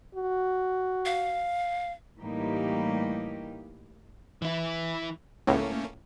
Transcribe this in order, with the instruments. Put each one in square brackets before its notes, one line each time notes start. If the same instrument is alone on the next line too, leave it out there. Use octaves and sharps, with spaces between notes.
[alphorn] F#4
[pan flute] F5
[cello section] A2 E3 G3 A#3 D#4 G4
[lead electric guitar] E3 E4
[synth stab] C#2 A2 [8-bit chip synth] A3 A#3 C#4